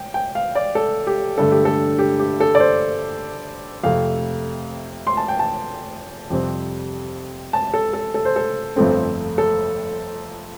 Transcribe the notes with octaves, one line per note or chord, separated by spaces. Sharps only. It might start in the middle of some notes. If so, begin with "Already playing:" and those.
Already playing: G5
G5
F5
D5
A4
G4
G2 D3 A3 A4
G4
A4
G4
G4
A4
D5
C5
F2 C3 A3 F5
C6
A5
G5
A5
F2 C3 G3 C4
A5
A4
A4
A4
C5
A4
G1 F2 F3 A3 C4
A4